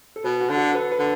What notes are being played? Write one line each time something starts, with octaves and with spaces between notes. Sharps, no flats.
A4
B2 B4
F#4
D3
A4
B4
B4
D3